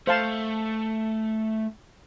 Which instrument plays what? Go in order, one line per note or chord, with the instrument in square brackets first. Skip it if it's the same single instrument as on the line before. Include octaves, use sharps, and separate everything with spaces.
[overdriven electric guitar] A3 [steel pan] C5 F5 A5